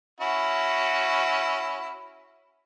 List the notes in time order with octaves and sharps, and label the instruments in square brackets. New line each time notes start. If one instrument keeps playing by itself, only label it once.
[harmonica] C#4 E4 F#4